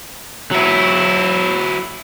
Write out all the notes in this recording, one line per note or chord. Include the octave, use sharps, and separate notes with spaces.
F#3 E4